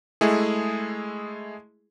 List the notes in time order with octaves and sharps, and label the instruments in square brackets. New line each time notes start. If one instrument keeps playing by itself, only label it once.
[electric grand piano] G#3 A3 E4 G#4